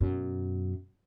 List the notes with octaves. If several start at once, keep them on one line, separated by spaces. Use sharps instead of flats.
F#2 B2